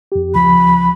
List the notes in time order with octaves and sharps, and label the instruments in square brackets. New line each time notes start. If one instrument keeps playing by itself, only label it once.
[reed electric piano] F2 G4
[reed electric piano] C#2 F3 [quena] B5